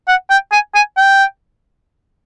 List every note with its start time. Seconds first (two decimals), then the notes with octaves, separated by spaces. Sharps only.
0.08 F#5
0.30 G5
0.52 G#5
0.75 G#5
0.97 G5